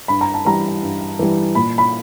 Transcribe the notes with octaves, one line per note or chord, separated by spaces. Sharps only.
G2 B5
A#5
A5
E3 G3 A#5
G2
E3 G3
A#2 B5
B5